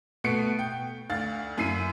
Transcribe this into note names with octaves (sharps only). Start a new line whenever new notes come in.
B2 A3 B3 C#7 D7
G5
D2 F5 A6
F#2 E4 C7 D#7